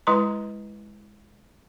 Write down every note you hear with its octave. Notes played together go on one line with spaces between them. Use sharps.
G#3 E4 B4 A#5 C6